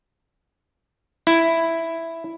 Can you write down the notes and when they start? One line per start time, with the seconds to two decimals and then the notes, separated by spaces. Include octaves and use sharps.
1.27 E4